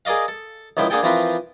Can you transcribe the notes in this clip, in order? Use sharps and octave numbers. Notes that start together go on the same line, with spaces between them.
G#4 A#4 D5 D#5 F5
A4
C#2 D#3 F3 E4 G5
D3 A#3 G#4 A4 G5
E3 F3 C4 F4 A#4 B4